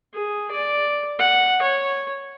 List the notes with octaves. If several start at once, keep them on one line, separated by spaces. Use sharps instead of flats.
G#4
D5
F#5
C#5